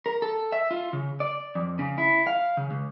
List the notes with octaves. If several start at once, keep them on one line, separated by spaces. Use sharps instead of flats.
A#4
A4
E5
F4
C#3
D5
F2
C#3
E4
F5
C#3
C#2